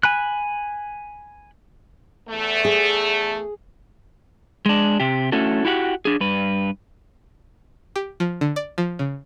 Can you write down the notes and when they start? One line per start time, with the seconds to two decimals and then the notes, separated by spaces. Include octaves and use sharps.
0.03 G#5 B5 F#6
2.29 E2 A3
2.65 G#4
4.66 G#3 D4
5.00 C3 G4
5.32 A3 C#4 E4 F#4 A4
5.65 E4 F#4 G4 F#5
6.05 D4 G#4
6.20 G2 B4
7.96 G4
8.20 F3
8.41 D3
8.56 D5
8.78 F3
8.99 C#3